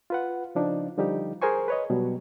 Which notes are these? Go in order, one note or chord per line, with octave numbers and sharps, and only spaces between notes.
F4 B4 F#5
C#3 F3 D4 D#4
D3 F3 G3 D#4 G4
G#4 A#4 C5 G#5 C#6
B4 C#5 D#5
B2 F#3 G3